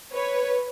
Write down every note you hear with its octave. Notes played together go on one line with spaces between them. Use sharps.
B4 C#5